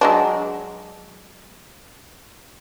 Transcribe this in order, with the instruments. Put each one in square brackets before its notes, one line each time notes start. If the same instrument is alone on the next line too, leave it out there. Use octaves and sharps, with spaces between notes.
[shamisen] F#3 G#3 D4